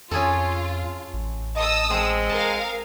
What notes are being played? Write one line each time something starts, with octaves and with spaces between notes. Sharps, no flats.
F2 C#4 F4 G#4 A4
A1
D#5 A5 D#6 E6
G#3 C4 C5
A#4 F5 A5